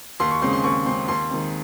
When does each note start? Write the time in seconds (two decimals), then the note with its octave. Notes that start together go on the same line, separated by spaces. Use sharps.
0.20 D#2 C6
0.31 C#6
0.42 C#3 G#3 C4 C6
0.53 C6
0.64 D#2 C#6
0.86 C#3 G#3 C4 C6
1.08 D#2 C6
1.31 D#3 G#3 C4